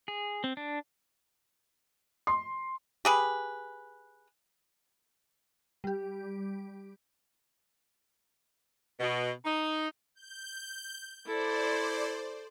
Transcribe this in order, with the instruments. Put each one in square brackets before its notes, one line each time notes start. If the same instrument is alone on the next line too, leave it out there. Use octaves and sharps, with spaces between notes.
[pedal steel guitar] G#4
C4
D4
[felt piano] C6
[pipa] G4 G#4 B4
[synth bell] G3 G4
[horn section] B2
D#4
[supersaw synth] G6
[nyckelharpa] E4 A4 [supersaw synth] C5 D5